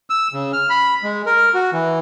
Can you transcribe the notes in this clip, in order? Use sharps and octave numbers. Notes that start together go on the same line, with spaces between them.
E6
C#3
F6
B5
G#3
A#4
F#4
E3